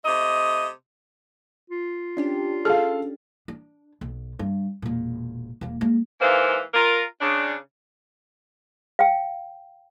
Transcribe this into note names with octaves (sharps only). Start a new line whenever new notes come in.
C3 A3 D#5
F4
C#4 D4 G4
G#4 A4 F5
D4
B1
G2
E1 A#2
E1 A#3
G#3 A#3
G#2 E3 A#3 C5 F5
F4 A#4
C#3 D4
F5 G5